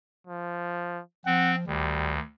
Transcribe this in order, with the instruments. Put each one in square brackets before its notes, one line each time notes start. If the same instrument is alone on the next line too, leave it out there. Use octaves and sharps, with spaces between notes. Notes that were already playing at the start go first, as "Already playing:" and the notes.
[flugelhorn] F3
[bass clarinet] F3 [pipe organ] C4 [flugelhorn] F#5
[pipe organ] D2 [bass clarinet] D#3 [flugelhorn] G3